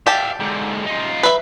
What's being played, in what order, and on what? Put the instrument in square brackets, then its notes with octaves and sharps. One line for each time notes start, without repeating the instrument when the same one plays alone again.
[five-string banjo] G4 A5 [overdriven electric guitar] E5 F5
[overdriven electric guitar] G#2 D3
D#4 F4
[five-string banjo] B4 E5